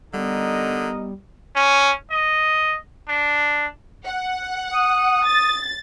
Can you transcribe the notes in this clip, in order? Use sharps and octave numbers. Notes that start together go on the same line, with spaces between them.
D3 G3 B3 D#4 A#4 D#5
C#4
D#5
D4
F#5
D#6
A6